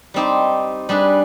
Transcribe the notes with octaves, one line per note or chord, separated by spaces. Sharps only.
G3 C4 D#4 G4
G3 D4 G#4 B4